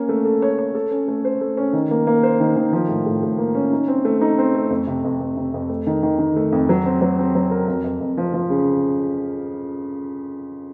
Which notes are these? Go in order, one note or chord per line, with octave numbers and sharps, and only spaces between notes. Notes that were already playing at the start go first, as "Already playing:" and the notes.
Already playing: A#3 C#4 C#5
A3
A4
C#5
C#5
A4
C#4
A3
C5
A3
C#4
D#3
A#3
A#3
C5
D#3
D#3
F3
A2
A2
A2
A#3
C#4
D#4
C4
A3
D#4
C4
A3
F2
C3
F2
F2
C3
F2
A3
D#3
D#3
D#3
A3
F2
F#3
C4
F#3
C4
F#3
A#4
F2
F2
F2
F3
F3
C#3